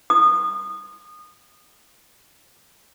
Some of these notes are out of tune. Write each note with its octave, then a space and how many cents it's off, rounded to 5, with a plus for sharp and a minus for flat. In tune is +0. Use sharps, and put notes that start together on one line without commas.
D#6 -25